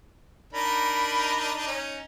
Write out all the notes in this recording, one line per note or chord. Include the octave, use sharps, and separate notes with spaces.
D4 D#4 A#4 B5
C#4 D#4